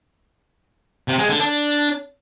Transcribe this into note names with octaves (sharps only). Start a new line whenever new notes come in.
C3
G#3
D3
D4